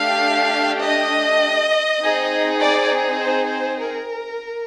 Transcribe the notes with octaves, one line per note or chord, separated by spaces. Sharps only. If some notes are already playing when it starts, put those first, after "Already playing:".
Already playing: A3 D4 G4 F5
D#5
C4 D#4 G#4
D5
C5
C5
A#4